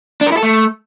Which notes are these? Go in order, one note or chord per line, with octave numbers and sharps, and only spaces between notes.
D4
A#4
E4
A4
A3